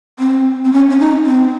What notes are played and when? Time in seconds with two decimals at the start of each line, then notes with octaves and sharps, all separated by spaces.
0.19 C4
0.65 C4
0.73 C#4
0.90 C#4
1.00 D#4
1.26 C4